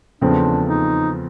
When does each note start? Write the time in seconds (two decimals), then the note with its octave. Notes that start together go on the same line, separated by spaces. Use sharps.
0.21 E2 C#3 F3 A3 C4 D4
0.69 D#4